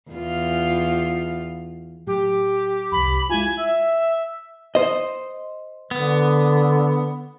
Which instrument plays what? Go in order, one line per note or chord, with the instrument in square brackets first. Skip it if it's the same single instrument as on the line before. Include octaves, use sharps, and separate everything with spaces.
[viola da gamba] E2 F4
[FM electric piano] A2 F#3 [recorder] G4
[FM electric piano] C2 F2 [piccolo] B5
[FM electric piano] G#3 E4 F4 [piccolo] G#5
[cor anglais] E5
[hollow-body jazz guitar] C5 D#5
[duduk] D3 [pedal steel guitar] B3